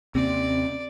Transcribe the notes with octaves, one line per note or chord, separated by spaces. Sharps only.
D#2 C3 A#3 C4 C#4 D5